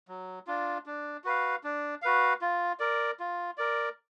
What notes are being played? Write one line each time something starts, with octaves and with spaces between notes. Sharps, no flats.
F#3
D4 F4
D4
F#4 B4 F5
D4
F#4 B4 F5
F4
A#4 D5
F4
A#4 D5